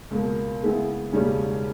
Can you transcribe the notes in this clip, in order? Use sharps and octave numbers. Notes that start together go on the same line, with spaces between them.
C#2 B2 A#3
C#3 G#3 B3 E4 G#4
E1 D#2 C#3 G3 C#4